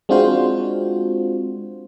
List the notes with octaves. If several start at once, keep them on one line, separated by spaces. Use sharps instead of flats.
G#3 C4 D4 F4 F#4 C5